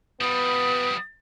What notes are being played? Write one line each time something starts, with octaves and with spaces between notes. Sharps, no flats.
F3 G3 B3 D#6